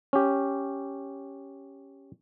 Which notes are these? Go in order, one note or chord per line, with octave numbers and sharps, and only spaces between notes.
C#4 G4